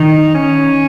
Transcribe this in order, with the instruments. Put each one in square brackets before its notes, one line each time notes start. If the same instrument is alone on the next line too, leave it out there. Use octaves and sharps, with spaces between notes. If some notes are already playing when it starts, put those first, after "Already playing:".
Already playing: [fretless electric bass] D#3 [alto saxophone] D#4
[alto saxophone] C#4